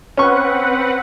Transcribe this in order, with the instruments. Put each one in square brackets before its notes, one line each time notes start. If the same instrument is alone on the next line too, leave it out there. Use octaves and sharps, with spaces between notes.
[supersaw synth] C4 B4 F#5 [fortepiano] C#4 C#6